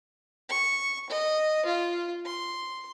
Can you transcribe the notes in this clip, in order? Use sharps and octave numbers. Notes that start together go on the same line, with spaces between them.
C#6
D#5
F4
C6